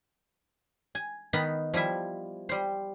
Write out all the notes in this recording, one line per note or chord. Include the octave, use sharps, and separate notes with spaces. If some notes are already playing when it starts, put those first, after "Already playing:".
G#5
D#3 B3 D#4 B5
F3 G3 E4 E5
G3 C5